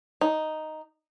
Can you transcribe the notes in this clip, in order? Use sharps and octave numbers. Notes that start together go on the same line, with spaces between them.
D#4